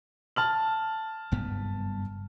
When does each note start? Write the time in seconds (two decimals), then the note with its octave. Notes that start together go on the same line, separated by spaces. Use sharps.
0.36 A5 F6 F#7
1.32 F#1 G2 B3